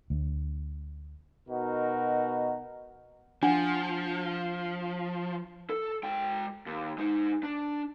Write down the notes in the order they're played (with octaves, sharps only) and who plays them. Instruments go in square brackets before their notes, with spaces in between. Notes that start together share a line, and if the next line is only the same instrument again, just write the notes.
[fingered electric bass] D2
[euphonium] B2 [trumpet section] D#4 F#4 A#4
[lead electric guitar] F3 [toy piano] D4 F#5
[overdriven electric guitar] A4
G#3 G5
D#2
G#3 D#4
D4